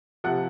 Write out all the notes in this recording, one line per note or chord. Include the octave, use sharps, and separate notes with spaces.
C3 F3 F#5